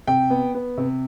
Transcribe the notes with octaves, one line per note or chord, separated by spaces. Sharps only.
C3 G5
B3
B3
C3